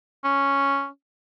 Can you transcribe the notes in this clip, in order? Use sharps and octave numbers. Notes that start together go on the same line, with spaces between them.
C#4